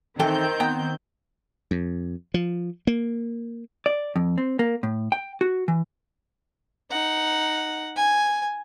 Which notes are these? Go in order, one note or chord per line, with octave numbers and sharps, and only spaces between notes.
D#3 E3 C4 A4 G5 G6
B3 G5 A#5
F2
F3
A#3
D5
F2
C4
A#3
A2
G5
F#4
E3
D#4 F#5
G#5